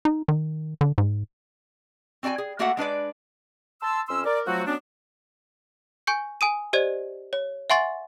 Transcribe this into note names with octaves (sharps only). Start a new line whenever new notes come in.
D#4
D#3
D3
G#2
C4 F#4 D5 G5 G#5
G#4
A3 A#3 F#4 A4 E5 F#5
G#3 D4 B4 D5
A5 C6 E6
F2 C#4 C6 E6
A#4 D5
F3 F#3 A3 C4 F#4
F#3 B3 C#4 D4
G#5 C#6 G6 C#7
G#5 D#6 D#7
G4 C5 D5 D#5 G#6
C#5
E5 F#5 G#5 C6 C#6 A6